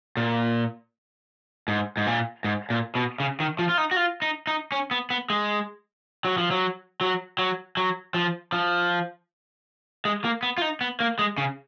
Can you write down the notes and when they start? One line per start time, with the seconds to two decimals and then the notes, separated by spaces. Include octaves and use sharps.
0.17 A#2
1.68 G#2
1.97 G#2
2.07 A#2
2.44 G#2
2.70 A#2
2.95 B2
3.20 C#3
3.40 D#3
3.59 F3
3.69 F4
3.78 D#4
3.91 F#4
3.96 F4
4.22 D#4
4.47 D#4
4.72 C#4
4.91 B3
5.10 B3
5.30 G#3
6.25 F#3
6.38 F3
6.51 F#3
7.01 F#3
7.39 F#3
7.77 F#3
8.14 F3
8.52 F3
10.05 G#3
10.24 A#3
10.43 B3
10.58 F4
10.62 D#4
10.81 B3
11.00 A#3
11.19 G#3
11.38 C#3